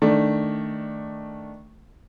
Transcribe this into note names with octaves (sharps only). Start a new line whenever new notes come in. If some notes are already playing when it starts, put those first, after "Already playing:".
D#3 A3 D4